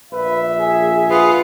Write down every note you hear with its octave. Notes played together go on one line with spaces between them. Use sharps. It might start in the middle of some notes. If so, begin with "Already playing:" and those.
A#1 B4 E5
G#4
F4 G#4 B4 F#5